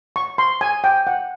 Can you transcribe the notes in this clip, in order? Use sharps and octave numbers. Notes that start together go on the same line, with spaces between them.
C#6
C6
G#5
G5
F#5